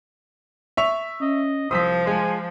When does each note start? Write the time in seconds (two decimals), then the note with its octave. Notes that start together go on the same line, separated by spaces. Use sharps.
0.77 E5 C#6 F7
1.21 C#4 D#5
1.71 C2 F3 C5 D#6 E6 B6
2.07 G#3 G#5